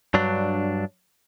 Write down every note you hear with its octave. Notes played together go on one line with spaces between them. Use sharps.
G2 F#3 D4